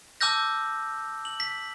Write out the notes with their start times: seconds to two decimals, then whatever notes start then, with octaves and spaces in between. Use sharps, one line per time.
0.21 A5 D6 E6 F6 G6 A#6
1.25 F#7
1.40 B6